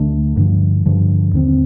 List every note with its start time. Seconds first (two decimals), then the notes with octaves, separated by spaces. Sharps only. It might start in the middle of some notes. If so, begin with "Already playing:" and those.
Already playing: D2 D3 A3 D4
0.37 G2 D3 F3
0.86 G2 D3 F3
1.33 D#2 D3 A3 C4